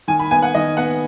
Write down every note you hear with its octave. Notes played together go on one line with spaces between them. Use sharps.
D#3 G#5
B5
B3 G#5
F#5
D#3 D#5
B3 F#5